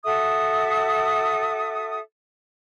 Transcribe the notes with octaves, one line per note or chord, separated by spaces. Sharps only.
F#4 A4 E5 D#6